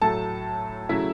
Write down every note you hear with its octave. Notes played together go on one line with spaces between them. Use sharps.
A2 F#3 A3 A4 A5
C#3 F#3 A3 E4 E5